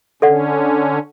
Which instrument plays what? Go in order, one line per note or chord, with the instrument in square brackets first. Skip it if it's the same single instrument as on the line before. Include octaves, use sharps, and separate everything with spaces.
[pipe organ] D3 C#4 [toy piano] A4 D5 F#5